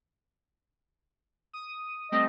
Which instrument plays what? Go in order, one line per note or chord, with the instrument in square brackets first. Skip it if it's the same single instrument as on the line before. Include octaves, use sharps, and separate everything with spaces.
[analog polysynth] D#6
[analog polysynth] G3 A3 C4 [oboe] D#5